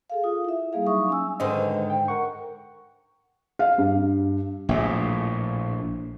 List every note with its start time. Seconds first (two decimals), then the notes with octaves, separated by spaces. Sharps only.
0.10 G#4 A4 F5
0.24 F4 D#6
0.44 E4 E5
0.73 G3 A#3 G#4 F5
0.87 F#3 D#4 E5 C#6 D#6
1.09 C#4 G#5 E6
1.40 G#2 D3 D#3 B4 C5 D#5
1.90 G5
2.08 A#4 F#5 C#6
3.59 F5
3.78 G2
4.69 A#1 A2